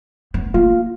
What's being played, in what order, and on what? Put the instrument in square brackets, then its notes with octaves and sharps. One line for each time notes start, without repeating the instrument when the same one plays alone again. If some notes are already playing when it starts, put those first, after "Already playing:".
[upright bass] B3
[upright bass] A#3 [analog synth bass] F4